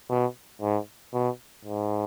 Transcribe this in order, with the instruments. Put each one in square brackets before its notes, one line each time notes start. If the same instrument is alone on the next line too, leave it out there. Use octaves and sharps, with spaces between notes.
[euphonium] B2
G#2
B2
G#2